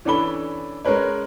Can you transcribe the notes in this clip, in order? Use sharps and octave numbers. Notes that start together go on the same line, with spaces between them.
E3 C#4 D4 A4 B5 G7
G#3 C#4 A#4 B4 C#5